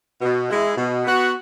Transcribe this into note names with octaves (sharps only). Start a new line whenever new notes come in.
B2
G#3 E4
B2
B3 F#4